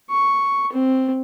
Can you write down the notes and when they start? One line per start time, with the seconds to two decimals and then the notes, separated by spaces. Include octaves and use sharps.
0.11 C#6
0.72 C4